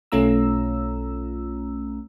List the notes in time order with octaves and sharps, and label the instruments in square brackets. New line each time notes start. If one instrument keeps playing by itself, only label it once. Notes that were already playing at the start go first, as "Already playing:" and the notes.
[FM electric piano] B1 A3 C#4 F4 A#5 E6